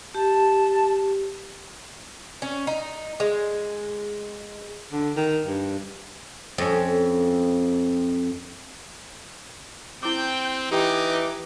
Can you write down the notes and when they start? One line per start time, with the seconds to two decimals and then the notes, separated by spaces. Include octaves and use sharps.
0.15 G4 A5
2.42 C#4
2.67 D#4
3.20 G#3
4.93 D3
5.17 D#3
5.45 G2
6.58 F2 C#4
10.03 C4 E4 G5 D6 G6
10.72 E3 D#4 G4 G5 B5 D6